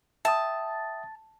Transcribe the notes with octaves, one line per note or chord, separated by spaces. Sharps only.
E5 G5 A5 D#6